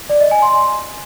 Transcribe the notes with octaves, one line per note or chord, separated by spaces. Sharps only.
D5
D#5
G#5
C6